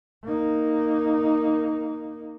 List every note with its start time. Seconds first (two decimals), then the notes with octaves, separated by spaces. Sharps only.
0.25 A#3 D#4